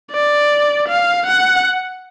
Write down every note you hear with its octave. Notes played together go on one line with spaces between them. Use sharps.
D5
F5
F#5